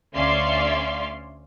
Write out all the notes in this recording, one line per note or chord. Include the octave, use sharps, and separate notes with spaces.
D2 C#4 D5 E5 F5 C6